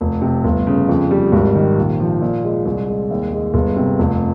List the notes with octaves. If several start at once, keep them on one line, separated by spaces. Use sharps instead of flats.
F1
C3
G1
C#3
F2
G3
G#1
D#3
A#1
F3
A#2
G#3
C2
G#3
D#2
G#3
G1
C3
F1